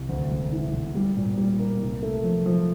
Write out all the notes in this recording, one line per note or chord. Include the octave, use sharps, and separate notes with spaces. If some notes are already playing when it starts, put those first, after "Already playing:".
Already playing: C2
D2
E1
E3
E1
G3
A#2
G3
A#3
C2
A3
F3
F3